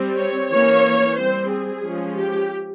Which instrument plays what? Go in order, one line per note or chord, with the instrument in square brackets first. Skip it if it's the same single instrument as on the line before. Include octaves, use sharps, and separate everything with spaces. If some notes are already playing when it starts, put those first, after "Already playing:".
Already playing: [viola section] G3 C4
C#5
E3 A#3 C#4 C#5
G3 C4 C5
G#4
F3 G#3 C#4
G4